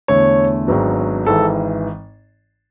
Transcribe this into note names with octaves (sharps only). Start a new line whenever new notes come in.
E2 D3 A3 C#5
G#1 G#2 F#3 B3 D4
G#1 G#2 E3 A4